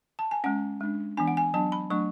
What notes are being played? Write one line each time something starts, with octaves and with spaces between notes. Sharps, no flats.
A5
G#5
G#3 C#4 F#5
G#3 D4
E3 B3 D4 G#5
F#5
G#5
F#3 B3 D4 A5
B5
F#3 A3 D4 C#6